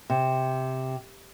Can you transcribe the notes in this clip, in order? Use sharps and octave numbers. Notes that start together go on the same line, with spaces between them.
C3